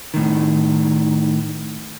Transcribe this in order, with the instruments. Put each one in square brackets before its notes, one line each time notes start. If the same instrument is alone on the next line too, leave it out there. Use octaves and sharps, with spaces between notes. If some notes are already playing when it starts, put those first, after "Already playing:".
[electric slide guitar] A2 D#3